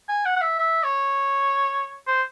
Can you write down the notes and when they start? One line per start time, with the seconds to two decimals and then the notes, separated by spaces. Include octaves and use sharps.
0.09 G#5
0.25 F#5
0.36 F#5
0.41 E5
0.58 E5
0.84 C#5
2.07 C5